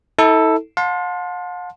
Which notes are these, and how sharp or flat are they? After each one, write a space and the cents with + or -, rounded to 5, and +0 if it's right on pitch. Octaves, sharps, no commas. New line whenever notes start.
E4 -40 A4 +5
F5 +45 A5 +0 C6 +0